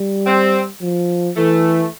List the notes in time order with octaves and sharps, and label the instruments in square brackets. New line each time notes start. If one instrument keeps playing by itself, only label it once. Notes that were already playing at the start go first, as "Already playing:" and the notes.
Already playing: [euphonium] G3
[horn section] C4
[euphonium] F3
[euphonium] E3 [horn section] A3